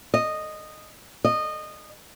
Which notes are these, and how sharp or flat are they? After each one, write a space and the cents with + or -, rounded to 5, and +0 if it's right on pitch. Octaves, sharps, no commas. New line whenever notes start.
D#5 -10
D#5 -20